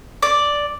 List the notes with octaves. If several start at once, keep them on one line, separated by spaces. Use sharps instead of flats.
D5